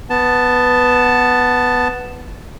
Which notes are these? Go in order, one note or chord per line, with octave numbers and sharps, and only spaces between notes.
B3 A5